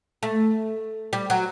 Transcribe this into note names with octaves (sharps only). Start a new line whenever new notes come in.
A3
G3
F#3